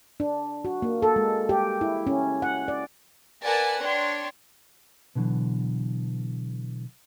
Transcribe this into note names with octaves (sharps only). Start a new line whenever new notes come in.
D4
F#4
A#3
A4
G#3
G4
E4
C#4
F#5
D5
A#4 B4 D5 F#5 G#5 A5
D4 C#5 G5 C6
B2 D3 E3 F#3